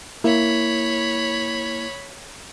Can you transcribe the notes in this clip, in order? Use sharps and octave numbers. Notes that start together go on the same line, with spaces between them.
A#3 E4 C#5 B5